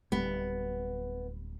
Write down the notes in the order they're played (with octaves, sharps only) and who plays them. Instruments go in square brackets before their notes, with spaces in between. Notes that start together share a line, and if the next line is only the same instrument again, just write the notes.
[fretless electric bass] D1 G3 [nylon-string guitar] B3